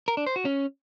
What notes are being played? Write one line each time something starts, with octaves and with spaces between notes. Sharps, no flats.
A#4
D4
C5
F#4
C#4